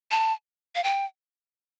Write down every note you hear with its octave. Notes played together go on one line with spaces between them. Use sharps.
A5
F5
G5